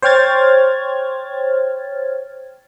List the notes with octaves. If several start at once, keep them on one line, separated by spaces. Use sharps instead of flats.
C5 C#5 G5 F6 G#6 A6